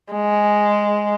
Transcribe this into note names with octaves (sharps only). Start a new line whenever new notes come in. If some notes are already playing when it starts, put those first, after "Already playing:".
G#3